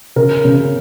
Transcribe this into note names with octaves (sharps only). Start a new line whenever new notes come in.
C#3 A#4
C#3